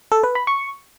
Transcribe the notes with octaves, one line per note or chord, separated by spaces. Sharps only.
A4
B4
B5
C#6